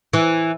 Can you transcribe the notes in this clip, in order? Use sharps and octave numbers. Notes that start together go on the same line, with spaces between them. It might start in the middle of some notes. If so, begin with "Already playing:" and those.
E3